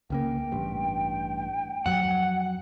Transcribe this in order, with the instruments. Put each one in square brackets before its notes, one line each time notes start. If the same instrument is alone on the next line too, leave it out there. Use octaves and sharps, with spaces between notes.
[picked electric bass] C#2 C#3 A#3 [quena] G5
[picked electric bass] A1 G2
[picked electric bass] F2 F#3 [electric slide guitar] F#5